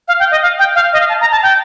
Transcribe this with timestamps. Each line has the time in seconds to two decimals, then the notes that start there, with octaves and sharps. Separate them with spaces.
0.08 F5
0.20 G5
0.31 D#5
0.42 F5
0.59 G5
0.75 F5
0.93 D#5
1.00 F5
1.09 A5
1.21 A#5
1.32 A5
1.43 G5